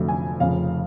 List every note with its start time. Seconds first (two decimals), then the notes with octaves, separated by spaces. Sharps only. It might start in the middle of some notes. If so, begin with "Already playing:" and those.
Already playing: F1 F2 D3 F#3 A3
0.08 G#5
0.40 F1 F2 C#3 F5